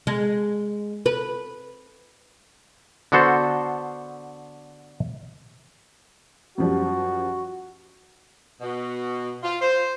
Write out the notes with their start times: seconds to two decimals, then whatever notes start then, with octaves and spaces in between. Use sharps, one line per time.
0.07 G#3
1.06 B4
3.12 D3 B3 F#4 A4 C5
6.58 F#2 F3 G3 F#4
8.60 B2
9.43 F4
9.61 C5